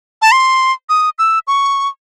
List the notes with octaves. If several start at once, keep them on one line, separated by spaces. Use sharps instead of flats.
A5
C6
D#6
E6
C#6